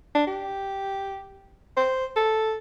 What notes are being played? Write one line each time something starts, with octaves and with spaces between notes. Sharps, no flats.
D4
G4
C5
A4